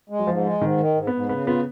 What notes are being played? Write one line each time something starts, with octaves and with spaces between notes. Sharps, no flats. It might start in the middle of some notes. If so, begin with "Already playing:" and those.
G#3
F#3
G#2 F3
G#3
G#2 D#3
D#3
G#2
B3
G#2
C#3 B3
B3 F4